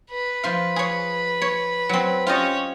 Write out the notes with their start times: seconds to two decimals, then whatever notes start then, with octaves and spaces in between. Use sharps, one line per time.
0.10 B4
0.43 F3 F4 F5
0.76 G#4 C#5
1.42 C#5
1.89 F#3 C4
2.27 C#4 F4 G4 C#5 D#5